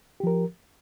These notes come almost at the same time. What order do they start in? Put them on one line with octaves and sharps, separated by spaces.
G4 F3 A#4